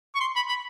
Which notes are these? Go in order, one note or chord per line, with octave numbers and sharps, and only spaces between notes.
C#6
C6
B5
B5